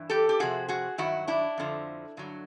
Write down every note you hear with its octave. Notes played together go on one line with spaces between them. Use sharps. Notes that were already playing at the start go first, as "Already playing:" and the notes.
Already playing: G2 E3
G4 A4
G4
F2 C3 F3 F#4 G#4
F#4 G#4
G2 D#3 F#3 E4 F#4
D4 E4
F2 D3 F3
G2 D3 F#3